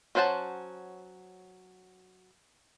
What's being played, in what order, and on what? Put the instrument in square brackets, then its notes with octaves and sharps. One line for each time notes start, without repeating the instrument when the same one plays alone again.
[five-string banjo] F#3 C#4 C5 F#5 A5